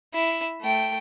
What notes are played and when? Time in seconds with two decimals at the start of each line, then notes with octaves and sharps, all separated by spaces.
0.14 E4
0.62 A3 G5